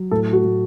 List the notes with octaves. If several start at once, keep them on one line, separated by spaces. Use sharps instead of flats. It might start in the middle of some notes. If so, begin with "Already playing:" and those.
Already playing: F#3
A2 A4
F#4
A2